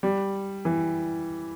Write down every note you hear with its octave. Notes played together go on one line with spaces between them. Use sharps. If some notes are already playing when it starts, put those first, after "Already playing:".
G3
E3